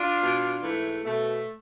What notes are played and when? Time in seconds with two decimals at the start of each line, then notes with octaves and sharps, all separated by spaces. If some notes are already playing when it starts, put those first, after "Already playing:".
Already playing: D4 F4
0.21 B2
0.63 G#2 E3 A3
1.04 B2 A3